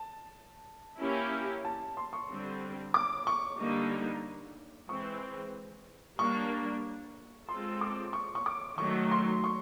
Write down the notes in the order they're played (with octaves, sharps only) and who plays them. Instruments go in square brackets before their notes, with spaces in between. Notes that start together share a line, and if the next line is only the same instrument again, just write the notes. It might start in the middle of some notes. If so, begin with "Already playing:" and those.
Already playing: [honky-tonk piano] A5
[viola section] A#3 C#4 E4 G4
[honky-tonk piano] A5
C6
C#6
[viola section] D3 G3 C4
[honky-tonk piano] D6
C#6
[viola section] D3 G3 A#3 D#4
[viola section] E3 G#3 C4 [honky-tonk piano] C#6
[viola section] G3 A#3 D4 [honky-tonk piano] C#6
[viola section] G#3 C4 F4 A4 [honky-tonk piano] C6
[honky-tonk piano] D6
C#6
C#6
D6
[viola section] D#3 F#3 A3 [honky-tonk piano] C#6
[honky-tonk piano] C6
C#6